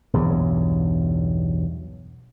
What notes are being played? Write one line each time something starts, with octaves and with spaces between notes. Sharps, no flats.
B1 E2 G2 F#3